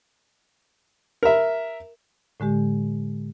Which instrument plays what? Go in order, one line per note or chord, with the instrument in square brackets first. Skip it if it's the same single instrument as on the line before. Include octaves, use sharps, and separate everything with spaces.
[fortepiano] A#4 E5
[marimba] A2 D3 G#3 G4